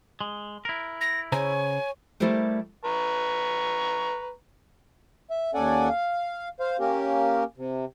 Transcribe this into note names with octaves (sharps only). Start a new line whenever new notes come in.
G#3
E4 A#4
A#6
C#3 C5 C#5 G#5 A#5
G3 A3 E4 G4 A#4 C5
B4 A#5 C#6
E5
D#2 C#4 A4 D5 F#5 G#5
F5
C5 F5
A#3 C#4 G4 A#4
C3